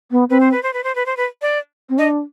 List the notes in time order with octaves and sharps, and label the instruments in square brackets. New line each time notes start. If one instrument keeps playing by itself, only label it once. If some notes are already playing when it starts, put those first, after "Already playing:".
[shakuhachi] B3
[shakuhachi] C4 [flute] B4
[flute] C5
B4
C5
B4
C5
B4
C5
B4
D5
[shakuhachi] C4
[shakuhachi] D4 [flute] D#5